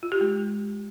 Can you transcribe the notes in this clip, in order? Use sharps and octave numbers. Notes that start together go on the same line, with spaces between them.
F4
G4
G#3